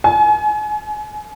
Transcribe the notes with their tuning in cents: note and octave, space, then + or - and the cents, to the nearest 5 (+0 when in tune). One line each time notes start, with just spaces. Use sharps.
G#5 +30